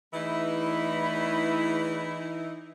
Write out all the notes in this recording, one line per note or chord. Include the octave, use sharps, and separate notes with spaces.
E2 E3 A3 D#4 E4 B5